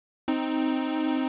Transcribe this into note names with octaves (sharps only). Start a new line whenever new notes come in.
C4 D#4